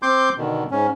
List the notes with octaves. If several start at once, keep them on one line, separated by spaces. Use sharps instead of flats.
C4 C6 D6 G6
B2 D3 D#3
G#2 C#4